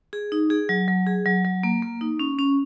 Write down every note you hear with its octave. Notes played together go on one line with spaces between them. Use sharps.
G#4
D#4
G#4
F#3
F#3
G#4
F#3
F#3
A#3
A#3
D#4
C#4
C#4